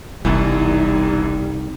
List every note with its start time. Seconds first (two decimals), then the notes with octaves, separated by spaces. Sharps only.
0.25 F#1 C2 F#2 B2 E3 G3 D#4